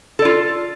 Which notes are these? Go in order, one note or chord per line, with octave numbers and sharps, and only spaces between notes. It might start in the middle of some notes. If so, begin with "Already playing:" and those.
F4 A4 D5